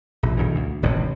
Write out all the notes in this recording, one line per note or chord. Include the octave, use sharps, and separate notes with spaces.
A#1
B1 G2 E3
D2
D#1 A1 A2 C3